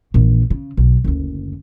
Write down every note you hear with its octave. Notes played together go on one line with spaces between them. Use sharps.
A#1 E3
C#3
B1
F#1 D2